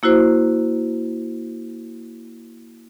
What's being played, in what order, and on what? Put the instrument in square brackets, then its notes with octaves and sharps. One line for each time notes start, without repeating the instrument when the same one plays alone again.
[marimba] A#3 E4 F#4 C5